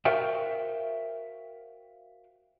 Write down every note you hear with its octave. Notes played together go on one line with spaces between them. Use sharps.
F#4 A#4 C5 E5 F5 G5